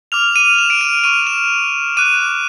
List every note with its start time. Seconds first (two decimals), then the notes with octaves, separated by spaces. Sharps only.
0.12 D6 F6 F7
0.36 D#7
0.58 E7
0.70 D7
0.81 D#7
1.04 C#6 F6 D#7
1.27 E7
1.97 D6 F#6 D#7